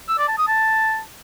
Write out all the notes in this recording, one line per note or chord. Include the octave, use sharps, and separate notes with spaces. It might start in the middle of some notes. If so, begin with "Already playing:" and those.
E6
D5
A5
D#6
A5